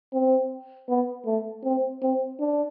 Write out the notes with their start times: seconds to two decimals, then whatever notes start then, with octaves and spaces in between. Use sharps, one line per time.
0.13 C4
0.89 B3
1.26 A3
1.64 C4
2.02 C4
2.40 D4